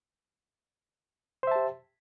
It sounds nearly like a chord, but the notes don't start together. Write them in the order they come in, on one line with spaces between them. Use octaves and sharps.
C5 E5 A5 G4